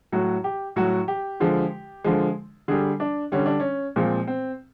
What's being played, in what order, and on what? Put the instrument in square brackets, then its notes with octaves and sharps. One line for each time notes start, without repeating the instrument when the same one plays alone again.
[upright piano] A2 F#3 F#4
G4
A2 F#3 F#4
G4
D3 F3 G#3
D3 F3 G#3
D3 G3 G#4
D4
D3 G3 C#4
D4
C#4
A#2 F3 G#3 C4
C4